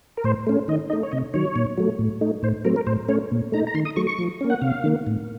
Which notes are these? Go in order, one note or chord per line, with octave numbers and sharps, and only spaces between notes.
A#4
A2 C5
A3 C#4
D#3 D#5
A3 D#4 D#5
C#5
C3 D#5
D#3 F#3 C#5
A#2
F#3 A3
A2
A3 D#4
A2 C5
F#3 A3 C4 A#4
A#4
A2 C5
A3 C#4 C#5
A#2
A3 D#4 A#5
A#5
D#3 C6
D#6
F#3 A3 C#6
C#6
F3
A#3 C#4
F#5
C3 F5
D#3 A#3
A2